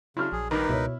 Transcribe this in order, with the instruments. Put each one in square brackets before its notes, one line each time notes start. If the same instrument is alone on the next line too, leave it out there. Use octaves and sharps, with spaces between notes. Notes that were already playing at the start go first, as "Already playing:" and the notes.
[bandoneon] C#3 [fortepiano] F#3 D4 [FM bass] E4 [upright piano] C6 F6
[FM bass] A#1 [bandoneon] G#4
[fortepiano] G#1 G2 D#3 [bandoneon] D#4 A#4 B4 [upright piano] A#5
[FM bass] C#2 [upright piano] B2 C#5 [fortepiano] E4